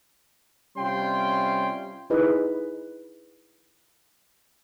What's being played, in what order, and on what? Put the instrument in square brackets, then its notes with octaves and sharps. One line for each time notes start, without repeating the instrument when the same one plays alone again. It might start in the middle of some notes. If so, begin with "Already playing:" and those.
[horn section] C3 G3 C#4 F4 G5 C6
[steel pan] D#4 E4 G#4 B4 D#5